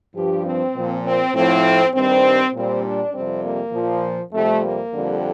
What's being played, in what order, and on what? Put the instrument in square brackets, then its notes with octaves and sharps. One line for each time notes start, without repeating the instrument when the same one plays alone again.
[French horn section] G2 F3 G4
C4
A#2 F3
C4
A2 F3 C4
G2 D#3 G3 C4
A#2 G3 C4
D4
F2 C3 G3 C4
A#3
A#2 F3
F2 C3 G3 A3
A#3
F2 D3 G3